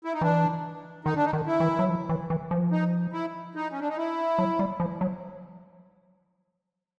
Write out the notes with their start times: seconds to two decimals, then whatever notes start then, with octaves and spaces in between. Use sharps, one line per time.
0.05 E4
0.14 D#4
0.21 E3 D4
1.05 D#3 D#4
1.15 D4
1.25 D#4
1.33 D#3
1.47 E4
1.60 E3
1.79 F#3
1.89 F3
2.09 E3
2.30 E3
2.51 F3
2.72 D#4
3.13 E4
3.55 D#4
3.72 C#4
3.80 D4
3.89 D#4
3.97 E4
4.39 F#3
4.59 G3
4.80 F3
5.01 F#3